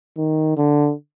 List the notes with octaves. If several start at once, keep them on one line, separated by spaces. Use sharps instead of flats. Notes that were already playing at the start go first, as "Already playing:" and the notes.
D#3
D3